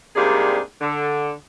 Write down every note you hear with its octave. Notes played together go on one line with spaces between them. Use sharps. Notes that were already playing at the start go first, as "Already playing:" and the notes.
G#2 C3 G3 A#3 D4 G#4
D3